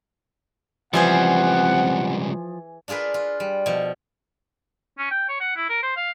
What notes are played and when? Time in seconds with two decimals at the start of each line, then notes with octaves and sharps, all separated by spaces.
0.93 C#2 E3 F3 G3 C4 G#4 C5 F#5
2.88 D4 F4 G#4 A#4 B4
3.14 F4
3.40 G3
3.66 B2 F3
4.98 C#4
5.11 G5
5.29 C#5
5.40 F#5
5.56 E4
5.70 A#4
5.83 C5
5.97 F5